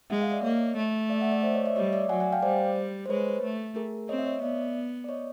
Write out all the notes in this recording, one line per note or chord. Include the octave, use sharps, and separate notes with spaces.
G#3 E5 F#5
D#5 F5
D5 E5
A#3 C#5 D#5
A3
D5 E5
E5 F#5
D5 E5
C5 D5
C#5 D#5
D5 E5
G3 C#5 D#5
D5 E5
F#3 F#5 G#5
F#5 G#5
F5 G5
G3 C5 D5
C5
G#3 B4 C#5
A3
G#4 A#4
C4 C#5 D#5
E5
C#5 D#5
B3 D5 E5
D5
C#5 D#5